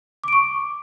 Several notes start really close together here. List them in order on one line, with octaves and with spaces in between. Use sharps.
D6 D7 C#6